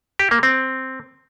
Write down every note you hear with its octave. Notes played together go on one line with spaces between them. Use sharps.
G4
A#3
C4